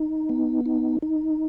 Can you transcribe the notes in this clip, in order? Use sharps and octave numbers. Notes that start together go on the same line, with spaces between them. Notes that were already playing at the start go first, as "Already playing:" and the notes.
Already playing: D#4
B3
D#4
D#4